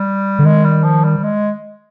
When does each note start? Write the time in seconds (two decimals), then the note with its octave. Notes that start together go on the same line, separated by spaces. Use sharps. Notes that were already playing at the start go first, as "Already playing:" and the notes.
Already playing: G3
0.39 D3
0.45 D#3 G#3
0.65 G3
0.84 F3
1.05 G3
1.24 G#3